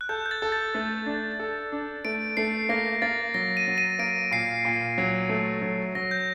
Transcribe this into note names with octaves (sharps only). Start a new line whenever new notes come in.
F#6
A4 G6
G6
A6
A4
A6
A3
D4
A4
D4
A3 D7
A3 C7
A#3 A#6
A#3 A6
F#3 A#6
D#7
F#3
D#7
A#3 D7
A#2 C7
A#2
F#3
A3
F#3
F#3 A#6
G6